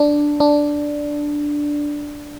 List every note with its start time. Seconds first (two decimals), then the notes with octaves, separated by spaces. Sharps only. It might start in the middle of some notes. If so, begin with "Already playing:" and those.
Already playing: D4
0.40 D4